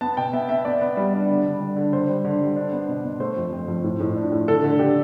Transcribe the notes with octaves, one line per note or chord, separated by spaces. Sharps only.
B3 A5
B2 G5
B3 E5
B3 E5
B3 D5
B3
G3
D4
D3
D3
G3
D3
D3 C5
G3
D3
G3
D4
B3
B2
B2
A3 C5
F2
F2
F2
A2
A2
D4
A2
D3 A4
D3
D3 G4